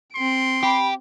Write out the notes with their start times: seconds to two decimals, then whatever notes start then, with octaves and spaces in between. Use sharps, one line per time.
0.15 C4 C6 D7
0.63 G4 B5